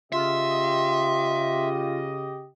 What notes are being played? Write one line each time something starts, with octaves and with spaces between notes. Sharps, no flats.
C#3 F4 G4 D#5 E5 C6